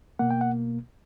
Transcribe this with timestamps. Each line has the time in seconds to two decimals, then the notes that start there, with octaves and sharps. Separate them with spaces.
0.19 B2 A#3 F#5
0.31 G5
0.41 F#5